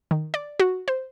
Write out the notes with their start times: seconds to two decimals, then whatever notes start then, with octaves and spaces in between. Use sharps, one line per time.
0.11 D#3
0.34 D5
0.60 F#4
0.88 C5